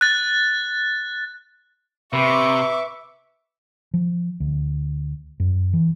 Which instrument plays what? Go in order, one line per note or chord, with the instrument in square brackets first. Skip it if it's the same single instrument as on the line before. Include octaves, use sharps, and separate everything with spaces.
[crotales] F#6 A6
[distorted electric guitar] C3 [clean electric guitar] B4 [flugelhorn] E5 [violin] C#6 D6
[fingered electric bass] F3
D2
F#2
E3